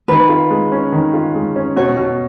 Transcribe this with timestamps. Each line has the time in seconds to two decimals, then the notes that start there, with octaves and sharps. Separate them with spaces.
0.08 D#3 B4
0.29 F4
0.50 G#3
0.72 C#4
0.92 D#3
1.14 F4
1.35 G#3
1.56 C#4
1.76 B2 C#5
1.97 B2